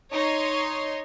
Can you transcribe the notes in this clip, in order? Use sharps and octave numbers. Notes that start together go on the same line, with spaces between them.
D#4 C#5 C6